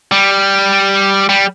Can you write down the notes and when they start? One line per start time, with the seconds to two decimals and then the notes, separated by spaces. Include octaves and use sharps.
0.12 G3
1.29 G3